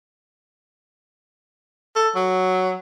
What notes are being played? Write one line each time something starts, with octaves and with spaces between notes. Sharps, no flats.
A4
F#3